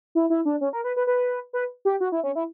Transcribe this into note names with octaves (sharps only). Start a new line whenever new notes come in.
E4
E4
D4
C#4
A#4
B4
B4
B4
B4
G4
F#4
E4
C#4
E4